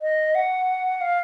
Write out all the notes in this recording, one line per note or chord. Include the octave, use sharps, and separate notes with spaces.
D#5
F#5
F5